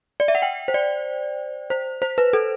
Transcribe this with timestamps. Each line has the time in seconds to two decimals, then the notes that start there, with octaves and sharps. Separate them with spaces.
0.20 D5
0.28 E5
0.35 F#5
0.42 G5
0.68 C5
0.74 D5
1.70 C5
2.02 C5
2.18 B4
2.33 A4